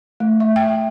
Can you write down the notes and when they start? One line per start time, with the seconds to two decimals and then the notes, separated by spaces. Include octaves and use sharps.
0.20 A3
0.40 E5
0.56 G5